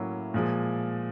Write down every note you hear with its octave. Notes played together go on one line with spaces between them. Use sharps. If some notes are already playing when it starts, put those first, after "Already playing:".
Already playing: A2 F#3 A#3 C#4 E4
A#2 F3 G#3